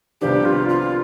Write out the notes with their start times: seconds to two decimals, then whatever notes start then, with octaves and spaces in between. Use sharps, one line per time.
0.21 C2 C3 F3 B3 D4 G4
0.45 F4
0.69 F4